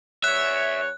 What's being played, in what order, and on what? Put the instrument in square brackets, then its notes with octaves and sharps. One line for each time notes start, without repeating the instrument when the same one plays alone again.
[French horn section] E2 C#5 [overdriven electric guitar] E5 [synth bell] F#6